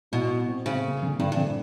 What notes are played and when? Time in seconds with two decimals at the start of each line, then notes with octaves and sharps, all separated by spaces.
0.12 B2 E4
0.30 E4
0.48 C4
0.66 C#3 C4
0.84 A#3
1.02 D3
1.19 G2 D3
1.32 G2
1.37 D3